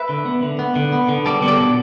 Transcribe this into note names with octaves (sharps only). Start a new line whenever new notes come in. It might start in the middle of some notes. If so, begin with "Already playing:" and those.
Already playing: B4 E5
D3
B3
D3
B3
D3
B3
D3
G3 A4 D5
B3
A4 D5
B2